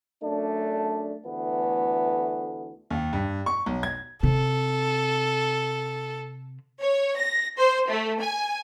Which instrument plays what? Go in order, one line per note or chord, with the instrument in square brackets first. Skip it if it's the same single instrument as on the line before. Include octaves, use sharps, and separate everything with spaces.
[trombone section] F#2 A3 D4
D2 E3 A3 B3
[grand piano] D#2
G2
C#6
B1
G#6
[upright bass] C3 [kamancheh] A4
[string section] C#5
A#6
C5
A3
G#5